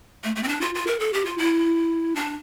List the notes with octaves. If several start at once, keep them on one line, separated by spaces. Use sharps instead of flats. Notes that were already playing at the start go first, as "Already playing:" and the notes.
A3
A3
C4
D4
F4
F4
A#4
A4
G4
F4
E4
D4